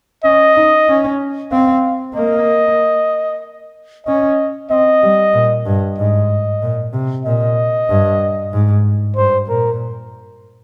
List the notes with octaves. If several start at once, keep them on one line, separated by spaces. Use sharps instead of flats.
C#4 D#5
D#4
C#4
C4 F5
A#3 D#5
C#4 D#5
C4 D#5
G3
A#2
G2
G#2 D#5
A#2
C3
A#2 D#5
G2
G#2
G2 C5
A#2 A#4